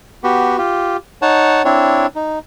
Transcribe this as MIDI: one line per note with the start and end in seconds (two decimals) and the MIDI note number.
0.24 0.58 59
0.24 0.58 66
0.24 0.58 67
0.58 0.97 65
0.58 0.97 67
1.22 1.62 63
1.22 1.62 73
1.22 1.62 78
1.22 1.62 81
1.65 2.07 60
1.65 2.07 62
1.65 2.07 64
1.65 2.07 73
2.15 2.39 63